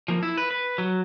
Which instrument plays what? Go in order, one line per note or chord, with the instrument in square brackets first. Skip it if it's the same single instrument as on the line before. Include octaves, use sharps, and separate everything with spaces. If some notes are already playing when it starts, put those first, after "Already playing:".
[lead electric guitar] F3 A#3
E4
B4
B4
F#3